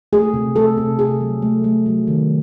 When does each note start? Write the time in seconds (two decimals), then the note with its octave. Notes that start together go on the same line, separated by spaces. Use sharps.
0.13 A3 G#4
0.34 C3
0.56 A3 A4
0.77 C3
0.99 C3 G#4
1.21 F#3
1.42 A3
1.64 A3
1.86 F#3
2.07 D#3